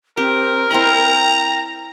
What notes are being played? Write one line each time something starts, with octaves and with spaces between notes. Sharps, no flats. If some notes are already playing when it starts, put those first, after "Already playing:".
C4 G4 A#4
C4 E4 D#5 G5 A#5